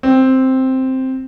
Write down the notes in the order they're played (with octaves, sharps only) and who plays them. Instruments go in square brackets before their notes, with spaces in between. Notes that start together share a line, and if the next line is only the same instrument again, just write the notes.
[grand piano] C4